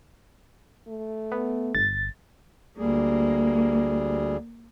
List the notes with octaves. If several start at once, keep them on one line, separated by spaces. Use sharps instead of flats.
A3
B3
G1 A6
D2 G3 A#3 G#4